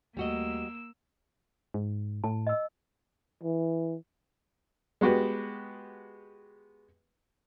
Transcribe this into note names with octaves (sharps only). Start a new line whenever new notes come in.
D#2 G3 A3 A#3 F#4 D#5 E6
G#2
A2 A5
D#5 E6
E3
G#3 B3 F#4 G4 B4